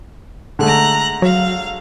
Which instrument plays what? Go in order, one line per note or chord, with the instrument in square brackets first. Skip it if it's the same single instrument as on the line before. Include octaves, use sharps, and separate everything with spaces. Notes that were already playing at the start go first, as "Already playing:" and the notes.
[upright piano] D3 G#3 A3 [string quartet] A#5 F#6
[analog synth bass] F#3 [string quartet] F5